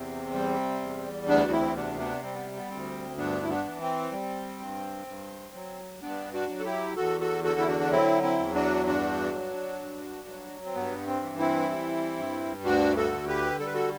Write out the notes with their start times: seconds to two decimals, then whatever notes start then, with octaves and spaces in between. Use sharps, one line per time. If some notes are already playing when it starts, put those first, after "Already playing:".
Already playing: E2 C3 C4
0.34 G3
0.81 E2
1.28 D2 B3 D4
1.44 F#4
1.52 C4 E4
1.76 C3 B3 D4
1.99 B3 D4
2.23 G3 C4
2.35 B3
2.57 B3
2.70 D2 C4
3.18 G2 B3 D4
3.42 E4
3.49 B3 D4
3.65 E3
3.81 C4
4.12 G3
4.60 G2
5.07 G2
5.54 F#3
6.02 G2 B3 D4
6.33 D4 F#4
6.49 F#3
6.59 A4
6.65 E4 G4
6.96 E2 F#4 A4
7.20 F#4 A4
7.44 D3 F#4 A4
7.59 E4
7.68 D4 F#4
7.80 D4
7.91 F#3 C4 E4
8.23 C4 E4
8.39 E2
8.54 D4 F#4
8.86 G2 D4 F#4
9.33 F#3
9.81 G2
10.28 F#3
10.66 C4
10.75 G2 B3
11.07 C4
11.22 E3
11.39 C4 E4
11.70 G3
12.18 G2
12.64 D2 D4 F#4
12.97 F#4 A4
13.12 D3
13.28 G4 B4
13.59 G3 A4
13.67 B4
13.74 F#4 A4